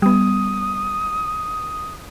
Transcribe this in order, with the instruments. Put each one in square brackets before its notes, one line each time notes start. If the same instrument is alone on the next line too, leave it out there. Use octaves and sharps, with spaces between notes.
[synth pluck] G3 B3 [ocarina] D#6